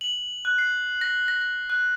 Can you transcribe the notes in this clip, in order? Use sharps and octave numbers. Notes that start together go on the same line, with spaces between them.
F#7
F#6
C7
A#6
A#6
A#6
F#6